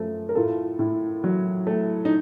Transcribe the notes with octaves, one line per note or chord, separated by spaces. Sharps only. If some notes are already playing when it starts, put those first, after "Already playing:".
Already playing: F#2 F3 A3
A#4
A2 F4 A4
A2
F#3
A3
D#4